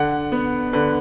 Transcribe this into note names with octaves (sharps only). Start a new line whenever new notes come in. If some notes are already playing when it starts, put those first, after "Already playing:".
Already playing: D3 F#5
B3
D3 B4